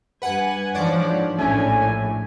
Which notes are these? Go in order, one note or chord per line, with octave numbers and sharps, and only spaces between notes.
G2 B4 F#5 G#5
G#2 E3 F3 D4 C#5 D5 F#5
A#1 A2 A3 C#4 D4 G#5